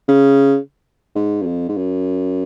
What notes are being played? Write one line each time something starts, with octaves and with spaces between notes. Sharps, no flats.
C#3
G#2
F#2
F2
G#2
F#2